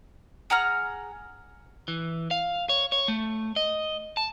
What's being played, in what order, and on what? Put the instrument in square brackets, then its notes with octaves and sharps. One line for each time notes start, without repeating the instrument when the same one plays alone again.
[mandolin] G#4 F#5 A#5 F6
[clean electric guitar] E3
F5
C#5
C#5
A3
D#5
A5